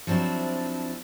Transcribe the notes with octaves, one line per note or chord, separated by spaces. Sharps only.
F3 F#3 C4 D4 E4